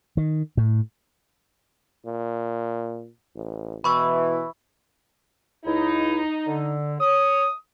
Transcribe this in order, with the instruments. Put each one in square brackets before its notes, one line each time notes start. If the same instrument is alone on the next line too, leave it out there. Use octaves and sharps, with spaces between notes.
[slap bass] D#3
A2
[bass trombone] A#2
A1
[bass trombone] B2 [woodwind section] E3 [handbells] B5 C#6 E6
[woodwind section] C#2 E4 [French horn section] D#4
[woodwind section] D3
[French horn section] C#5 [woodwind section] D#6